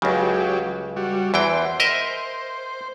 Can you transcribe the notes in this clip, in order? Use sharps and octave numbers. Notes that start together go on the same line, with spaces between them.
C#2 C#3 F#3 G4
G3 F#4
E2 E3 C5 G5
A#4 D#5 E5